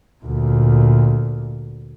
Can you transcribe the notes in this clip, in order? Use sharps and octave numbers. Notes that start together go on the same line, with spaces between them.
D2 A#2